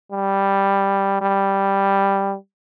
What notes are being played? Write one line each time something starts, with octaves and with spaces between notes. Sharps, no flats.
G3
G3